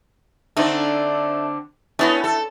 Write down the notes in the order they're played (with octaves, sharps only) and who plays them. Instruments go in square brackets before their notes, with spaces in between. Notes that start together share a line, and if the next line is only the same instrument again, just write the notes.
[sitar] D3 C4 [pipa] A3 D#4
[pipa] A3 E4 F#4 [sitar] B3 C#4
[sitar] A4